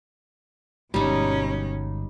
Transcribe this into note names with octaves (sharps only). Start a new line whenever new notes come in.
G1 C#2 B2 G3 G#3 C#4 D#4